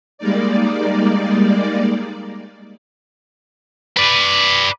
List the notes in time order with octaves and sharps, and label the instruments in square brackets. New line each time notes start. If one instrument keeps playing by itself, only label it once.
[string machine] G3 G#3 A#3 D#4 D5
[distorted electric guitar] B4 D5